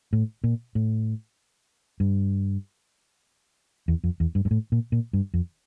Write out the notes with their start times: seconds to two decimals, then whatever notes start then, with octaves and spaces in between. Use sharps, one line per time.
0.13 A2
0.44 A#2
0.75 A2
2.00 G2
3.88 E2
4.04 F2
4.20 E2
4.35 G2
4.45 G2
4.51 A2
4.72 A#2
4.92 A#2
5.13 G2
5.34 F2